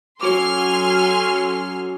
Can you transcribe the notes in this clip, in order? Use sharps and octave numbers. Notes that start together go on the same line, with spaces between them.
F#3 C#4 F#4 A4 G#5 C6 D6 F6